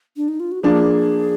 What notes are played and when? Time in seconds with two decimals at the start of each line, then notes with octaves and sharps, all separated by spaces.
0.17 D4
0.28 D#4
0.40 F4
0.52 F#4
0.63 F3 A#3 D4 G#4